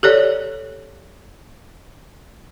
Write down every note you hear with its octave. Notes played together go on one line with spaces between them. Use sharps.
G4 A4 C#5 D5